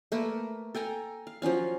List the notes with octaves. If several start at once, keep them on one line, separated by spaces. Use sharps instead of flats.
A3 A#3 A#4 B4
A4 G5 G#5 A#5
F5
F3 F#3 C#4 F5